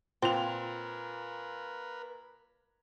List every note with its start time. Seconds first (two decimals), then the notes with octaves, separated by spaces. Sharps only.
0.22 A#2 C4 A#4 B4 F7